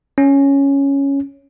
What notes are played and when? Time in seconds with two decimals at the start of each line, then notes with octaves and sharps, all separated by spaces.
0.18 C#4